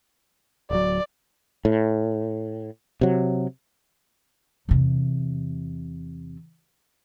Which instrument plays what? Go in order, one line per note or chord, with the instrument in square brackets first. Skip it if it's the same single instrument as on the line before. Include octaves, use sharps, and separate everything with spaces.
[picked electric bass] D1 F#3 [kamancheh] D5
[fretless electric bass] A2
C3 F#3
[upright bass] E2 C3